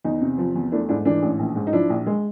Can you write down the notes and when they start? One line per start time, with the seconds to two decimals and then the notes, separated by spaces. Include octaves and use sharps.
0.04 E2 D#4
0.21 C3
0.38 F3
0.55 E2
0.72 A3 D4 E4
0.89 G#2 D4 E4
1.05 E3 D4
1.22 A1
1.39 A#1
1.55 G#2
1.67 D#4
1.73 F3 D4 E4
1.89 A#1
2.07 G#3